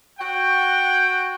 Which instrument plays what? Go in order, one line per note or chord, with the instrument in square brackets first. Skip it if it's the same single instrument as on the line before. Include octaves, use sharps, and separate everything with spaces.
[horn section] F#4 F#5 G5